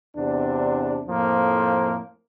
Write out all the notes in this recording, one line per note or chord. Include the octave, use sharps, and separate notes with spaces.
E2 C3 D4
F2 A2 F3 A#3